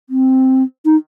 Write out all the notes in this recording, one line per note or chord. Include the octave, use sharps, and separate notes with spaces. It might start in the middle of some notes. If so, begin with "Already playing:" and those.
C4
D#4